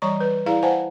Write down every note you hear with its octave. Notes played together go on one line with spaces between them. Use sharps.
E3 G3 C#5 D5 A#5 C#6
B4
E4 G#4 D5 F5 A#5
C5 F5 F#5 G#5 A5